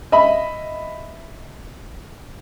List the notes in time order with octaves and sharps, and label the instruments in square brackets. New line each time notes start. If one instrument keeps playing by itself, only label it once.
[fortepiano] D#5 E5 B5